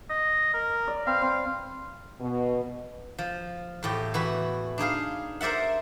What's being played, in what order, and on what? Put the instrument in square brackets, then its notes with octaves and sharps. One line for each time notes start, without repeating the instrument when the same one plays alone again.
[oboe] D#5
A#4
[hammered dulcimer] D5
[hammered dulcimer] C4 B4 [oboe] F5
[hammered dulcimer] C4
[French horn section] B2
[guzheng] F3
E2 A2 G4
E3 F#4 B5
D4 D#4 G#4 F5
A#4 C5 D5 E5 F#5